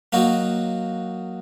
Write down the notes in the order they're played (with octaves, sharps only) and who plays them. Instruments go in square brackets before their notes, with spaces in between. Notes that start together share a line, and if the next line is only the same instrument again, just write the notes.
[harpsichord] F#3 A#3 D#4 F#4